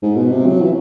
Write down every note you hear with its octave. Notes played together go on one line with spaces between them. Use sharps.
G#2
B2
C3
F#3
E3